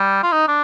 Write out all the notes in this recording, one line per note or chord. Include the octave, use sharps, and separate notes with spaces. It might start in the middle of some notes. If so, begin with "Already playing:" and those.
Already playing: G3
F4
D#4
D4